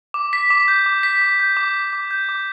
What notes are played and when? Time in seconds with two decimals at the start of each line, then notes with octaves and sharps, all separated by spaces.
0.14 D6
0.33 B6
0.50 D6
0.68 G6
0.86 D6
1.03 B6
1.21 D6
1.40 G6
1.57 D6
1.75 B6
1.93 D6
2.11 G6
2.29 D6